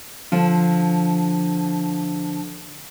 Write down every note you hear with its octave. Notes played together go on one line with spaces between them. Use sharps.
D3 F3 F4